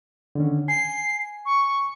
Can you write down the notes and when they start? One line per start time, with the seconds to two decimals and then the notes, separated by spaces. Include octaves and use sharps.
0.35 D3 D#3 C#4
0.68 G#5 C7
1.45 C#6